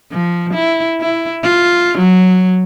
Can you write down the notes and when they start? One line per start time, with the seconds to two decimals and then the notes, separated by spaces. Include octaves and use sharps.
0.12 F3
0.54 E4
1.00 E4
1.43 F4
1.98 F#3